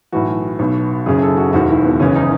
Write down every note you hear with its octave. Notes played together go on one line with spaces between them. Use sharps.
B1 A2 E3 F#4
B1 B2
F#1 F#2 C#3 G#4
A4
F#4
E1 D#2 D#3 F#4
E4
B3
F#1 E2 C#3 E3 C#4
D#4